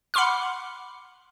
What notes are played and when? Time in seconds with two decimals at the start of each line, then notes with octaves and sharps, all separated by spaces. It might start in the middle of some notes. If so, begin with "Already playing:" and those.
0.14 F#5 B5 C6 D6 F6